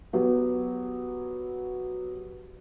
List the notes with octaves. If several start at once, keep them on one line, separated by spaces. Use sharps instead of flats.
F#3 B3 G4